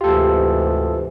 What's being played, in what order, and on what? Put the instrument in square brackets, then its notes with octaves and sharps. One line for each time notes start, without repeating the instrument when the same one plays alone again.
[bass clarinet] D2 [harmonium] G#2 C3 E3 [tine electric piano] F4 A4 [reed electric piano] G4